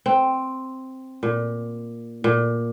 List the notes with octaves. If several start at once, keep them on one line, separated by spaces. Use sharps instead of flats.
C4
A#2
A#2